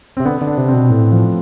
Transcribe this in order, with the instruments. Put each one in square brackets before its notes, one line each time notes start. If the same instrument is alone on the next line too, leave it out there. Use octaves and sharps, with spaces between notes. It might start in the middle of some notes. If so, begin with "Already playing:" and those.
[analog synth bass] C3 [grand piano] C4
[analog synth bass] D3 [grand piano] B3
[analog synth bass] D3
[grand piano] D4
[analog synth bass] C3
[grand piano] C4
[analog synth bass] B2
[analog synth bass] A2 [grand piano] A3
[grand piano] F3